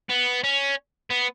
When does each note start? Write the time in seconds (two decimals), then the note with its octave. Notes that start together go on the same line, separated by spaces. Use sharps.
0.10 B3
0.44 C#4
1.10 B3